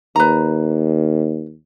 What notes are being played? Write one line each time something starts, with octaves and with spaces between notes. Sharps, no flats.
D#2 B4 A#5